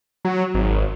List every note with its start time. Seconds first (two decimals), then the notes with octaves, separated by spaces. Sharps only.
0.25 F#3
0.54 G#1